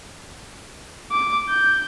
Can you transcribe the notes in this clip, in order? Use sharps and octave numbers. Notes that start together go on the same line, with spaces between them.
D6
G6